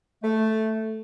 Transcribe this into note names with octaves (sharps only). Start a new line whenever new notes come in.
A3